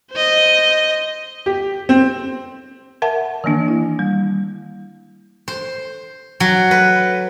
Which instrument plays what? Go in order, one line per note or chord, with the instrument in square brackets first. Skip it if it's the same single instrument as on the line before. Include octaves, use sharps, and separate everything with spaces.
[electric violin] C5 D#5
[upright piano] G4
C4
[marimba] A#4 E5 F#5 A5
D#3 E3 A#3 D4
E4
G3
[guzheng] C5
F#3
B4